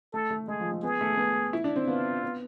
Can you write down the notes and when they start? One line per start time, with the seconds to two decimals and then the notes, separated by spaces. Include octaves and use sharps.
0.13 A3 A4
0.30 A3
0.48 G#3 G#4
0.60 F3
0.72 G#3
0.82 B3 G#4
1.01 A3
1.17 B3
1.53 E4
1.64 D4
1.76 C4
1.87 B3 F4
2.23 B3